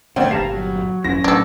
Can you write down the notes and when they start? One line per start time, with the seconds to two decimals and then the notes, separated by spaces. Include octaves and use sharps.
0.16 D2 B2 D#3 C4 D4
0.31 G1 A#2 G3 F5 A5 A#5
0.52 F#3
1.04 G#1 F#2 F3 C#4 E4 A#6
1.24 A#1 A2 F#3 D4 A4